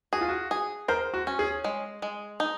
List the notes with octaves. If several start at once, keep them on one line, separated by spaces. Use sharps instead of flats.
F#4 G#4
F4
F#4
G#4
A#4 C5
F#4
C#4
G#4
G#3
G#3
D#4